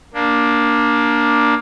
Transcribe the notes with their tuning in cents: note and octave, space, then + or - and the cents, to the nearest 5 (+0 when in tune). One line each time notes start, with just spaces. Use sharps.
A#3 +15 D4 +0